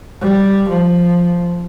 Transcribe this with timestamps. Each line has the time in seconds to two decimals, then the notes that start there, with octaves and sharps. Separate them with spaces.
0.21 G3
0.69 F3